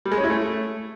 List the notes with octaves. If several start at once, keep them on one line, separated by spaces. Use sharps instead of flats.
G3
G#3
C#4
E4
A3